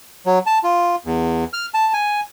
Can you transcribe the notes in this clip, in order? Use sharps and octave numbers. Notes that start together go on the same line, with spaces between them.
F#3
A5
F4
E2
F6
A5
G#5